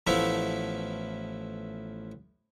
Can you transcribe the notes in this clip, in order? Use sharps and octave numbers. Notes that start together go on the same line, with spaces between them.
A1 F3 A3 B3 E4 F5